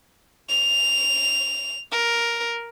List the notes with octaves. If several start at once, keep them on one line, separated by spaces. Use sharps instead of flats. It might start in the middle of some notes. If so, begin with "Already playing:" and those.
F7
A#4